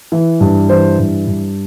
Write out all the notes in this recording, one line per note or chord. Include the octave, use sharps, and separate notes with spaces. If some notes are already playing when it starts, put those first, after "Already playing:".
E3
G2
E3 C5
G2
G2